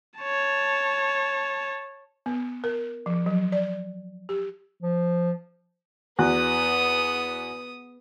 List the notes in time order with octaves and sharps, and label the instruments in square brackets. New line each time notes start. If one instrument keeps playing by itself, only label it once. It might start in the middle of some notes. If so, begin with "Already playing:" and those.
[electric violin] C#5 A5
[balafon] B3
A#4
F3
F#3
D5
G4
[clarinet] F3
[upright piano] E2 F#4 F#6 [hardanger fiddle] B3 D#6